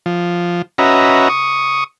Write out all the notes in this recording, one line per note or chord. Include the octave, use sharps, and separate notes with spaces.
F3
C#4 F#4 B4 D#5 E5 A#5
C#6 D#6